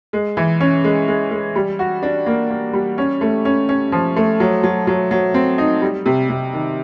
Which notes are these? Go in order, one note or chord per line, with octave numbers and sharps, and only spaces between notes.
G#3
E3
C#4
G#3
G#3
G#3
G3
F#4
D4
A#3
A#3
G3
C#4
A3
C#4
C#4
F3
A3
F#3
F#3
F#3
F#3
C4
D#4
G3
C3
C3
D#3